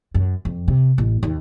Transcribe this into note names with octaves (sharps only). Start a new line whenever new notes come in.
F#2
F2
C3
A1
D#2